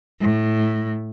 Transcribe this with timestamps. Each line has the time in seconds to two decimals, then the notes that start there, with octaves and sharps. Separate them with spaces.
0.20 A2